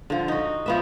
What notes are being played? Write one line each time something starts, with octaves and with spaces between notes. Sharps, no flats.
D3 F3
D#4 F#4
F3 B3 E5